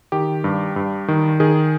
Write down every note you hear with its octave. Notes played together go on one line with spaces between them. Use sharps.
D#3 G4
G2
G2
D#3
D#3 G#4